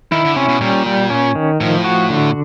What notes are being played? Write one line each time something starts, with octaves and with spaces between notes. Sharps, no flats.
D#3 E4
D3
C3 C#4
B2
A#2 G3
G3
C#4
D#3
A2 F3
F#4
D3